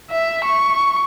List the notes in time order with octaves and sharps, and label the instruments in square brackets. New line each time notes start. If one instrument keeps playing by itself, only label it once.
[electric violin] E5
C#6